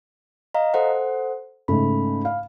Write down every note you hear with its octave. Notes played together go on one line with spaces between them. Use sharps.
D#5 F5 A#5
A4 C5 F#5
G#2 C#3 A3 B5
F5